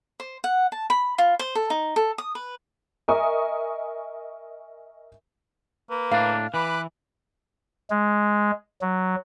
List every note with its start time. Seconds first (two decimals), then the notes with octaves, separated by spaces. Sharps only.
0.20 C5
0.44 F#5
0.72 A5
0.90 B5
1.18 F4
1.39 C5
1.55 A4
1.70 D#4
1.96 A4
2.18 D#6
2.35 B4
3.08 A#4 D#5 E5 G#5 C#6 D#6
5.90 A#3 B4
6.12 A2 D4 F5
6.54 E3 B4 B5 D6 F#6
7.90 G#3
8.82 F#3